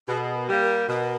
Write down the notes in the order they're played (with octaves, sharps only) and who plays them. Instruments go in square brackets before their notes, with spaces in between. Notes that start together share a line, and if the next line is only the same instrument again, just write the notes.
[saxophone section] B2 [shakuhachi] G#4
[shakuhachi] A4
G#4
A#4
[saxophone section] G3 A#3
[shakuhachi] A#4
[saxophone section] B2 [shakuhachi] A#4